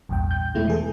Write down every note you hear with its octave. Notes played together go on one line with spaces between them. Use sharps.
A#1 E2 G2 G5
G6
E2 B2 G#3 A3 E4
E3 G#4 A4